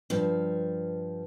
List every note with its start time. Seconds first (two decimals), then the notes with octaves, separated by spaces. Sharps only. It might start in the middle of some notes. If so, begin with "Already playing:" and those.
0.10 G2 F3